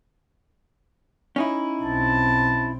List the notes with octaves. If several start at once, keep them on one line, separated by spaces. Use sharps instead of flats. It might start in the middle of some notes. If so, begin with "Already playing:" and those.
C#4 D#4 E4
B1 C4 A5